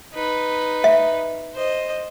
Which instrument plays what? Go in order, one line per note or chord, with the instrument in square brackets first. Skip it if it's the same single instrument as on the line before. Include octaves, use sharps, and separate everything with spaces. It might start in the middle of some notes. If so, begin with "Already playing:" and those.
[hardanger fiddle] D#4 B4
[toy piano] E5
[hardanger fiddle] C5 D#5